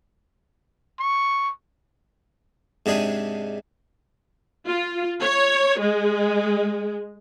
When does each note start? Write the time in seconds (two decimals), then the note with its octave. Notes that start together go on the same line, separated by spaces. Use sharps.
0.99 C#6
2.86 G#2 C3 D4 G#4
4.66 F4
5.22 C#5
5.80 G#3